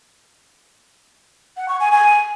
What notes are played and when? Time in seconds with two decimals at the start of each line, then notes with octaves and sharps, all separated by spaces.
1.57 F#5
1.68 C#6
1.80 G#5
1.92 G#5